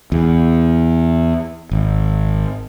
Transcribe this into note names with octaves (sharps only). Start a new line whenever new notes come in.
E2
G#1